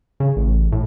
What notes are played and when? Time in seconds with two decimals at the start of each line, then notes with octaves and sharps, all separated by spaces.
0.20 C#3
0.36 A1
0.72 A2